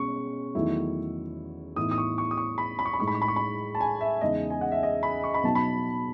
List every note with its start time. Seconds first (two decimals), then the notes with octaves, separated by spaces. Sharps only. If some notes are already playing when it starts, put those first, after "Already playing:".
Already playing: B2 G#3 C#4 C#6
0.55 E2 D#3 F#3 A3 E4
1.76 A2 E3 B3 D#4 D#6
1.91 D#6
1.98 C#6
2.18 C#6
2.31 D#6
2.37 C#6
2.58 B5
2.79 B5
2.85 C#6
2.93 B5
2.99 A2 G#3 D#4 C#6
3.07 B5
3.15 C#6
3.22 B5
3.28 C#6
3.36 B5
3.75 A5
3.81 G#5
4.01 E5
4.21 E2 C#3 G#3 D#4 D#5
4.50 G#5
4.61 F#5
4.72 E5
4.83 D#5
5.03 B5
5.23 C#6
5.34 B5
5.44 B2 F#3 B3 D#4 A5
5.55 B5